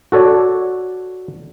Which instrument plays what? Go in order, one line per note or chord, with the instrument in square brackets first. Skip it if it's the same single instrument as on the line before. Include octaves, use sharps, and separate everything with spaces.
[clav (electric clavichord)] F#4 A4 C#5 D5